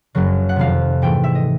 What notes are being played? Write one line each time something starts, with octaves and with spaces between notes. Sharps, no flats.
F#1 F#2 C#3 F#3
F#5
F2 C3 D#3 F5
G#2 E3 A3 G5
E5
D#5